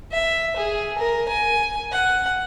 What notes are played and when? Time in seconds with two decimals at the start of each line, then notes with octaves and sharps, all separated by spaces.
0.12 E5
0.57 G#4
0.98 A#4
1.29 G#5
1.92 F#5